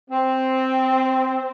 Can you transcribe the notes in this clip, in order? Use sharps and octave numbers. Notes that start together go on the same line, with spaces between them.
C4